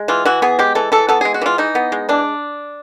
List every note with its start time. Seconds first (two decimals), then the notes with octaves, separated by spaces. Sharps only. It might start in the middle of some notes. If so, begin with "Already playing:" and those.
Already playing: G#3
0.08 E3 F4
0.25 E3 F#4
0.42 B3 G#4
0.59 G#3 G4
0.75 E3 A4
0.92 E3 A4
1.08 B3 A4
1.21 G#3 G#4
1.34 F#4
1.41 E3 F4
1.58 E3 D#4
1.75 B3
1.92 G#3
2.09 E3 D4